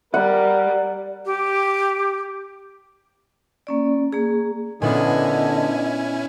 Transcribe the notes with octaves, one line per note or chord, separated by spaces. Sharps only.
G3 A#4 D5 F#5
G4
A#3 C#4 D5
A#3 G#4
A#2 D3 B3 C#4 D4 E4 D#5 G#5